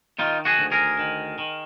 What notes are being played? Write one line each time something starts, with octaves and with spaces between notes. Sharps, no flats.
D#3 D#4 F4
F#4 G#4
D2
G#4 A#4
D#3
D#3